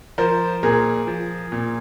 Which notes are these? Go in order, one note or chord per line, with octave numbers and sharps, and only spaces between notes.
F3 A#4 C5
A#2 G#4 A#4
F3
A#2